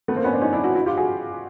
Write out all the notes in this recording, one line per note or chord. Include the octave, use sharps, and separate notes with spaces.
A3 B3
A#3 C4
B3 C#4
C4 D4
C#4 D#4
D4 E4
E4 F#4
E4 F#4
F4 G4
F#4 G#4